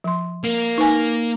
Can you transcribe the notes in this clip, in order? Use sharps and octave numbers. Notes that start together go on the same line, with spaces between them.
F3 C6
A#3
D#4 B4 G#5